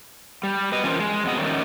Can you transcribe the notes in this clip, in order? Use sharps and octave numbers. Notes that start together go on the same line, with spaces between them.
G3
B4 D#5
E3 C#4 D#4 F4 A#4 C5
G#3
F2 B2 B3 D#5
D#3 G3 A3 C#4